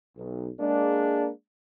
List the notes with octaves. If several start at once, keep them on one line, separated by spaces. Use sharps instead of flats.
B1
G#3 A#3 D4